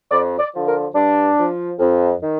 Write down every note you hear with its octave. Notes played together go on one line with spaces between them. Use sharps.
F2 D5
D5
D3 F3
A#4
G2 D4
F3
F2
D#3